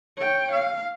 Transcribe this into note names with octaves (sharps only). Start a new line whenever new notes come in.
C#5 G5
F5